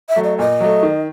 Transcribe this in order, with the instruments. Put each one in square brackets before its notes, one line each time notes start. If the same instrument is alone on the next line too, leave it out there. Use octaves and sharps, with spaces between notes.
[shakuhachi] E5
[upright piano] F#3 A3
[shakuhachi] D#5
[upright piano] A#2 [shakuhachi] D#5
[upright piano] F#3 A3
D#3